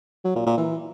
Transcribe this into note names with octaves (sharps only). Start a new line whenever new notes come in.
F#3
A#2
A#2
E3